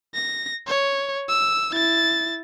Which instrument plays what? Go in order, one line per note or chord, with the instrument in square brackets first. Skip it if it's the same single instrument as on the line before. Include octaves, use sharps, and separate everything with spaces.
[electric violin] A#6
C#5
E6
E4 A6